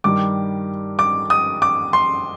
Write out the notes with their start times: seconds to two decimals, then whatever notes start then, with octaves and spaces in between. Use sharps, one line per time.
0.04 G2 D#3 G3 D6
0.99 D6
1.30 D#6
1.62 D6
1.93 C6